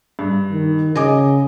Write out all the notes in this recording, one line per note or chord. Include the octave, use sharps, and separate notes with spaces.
G2
D#3
C#3 D#5 G#5 D6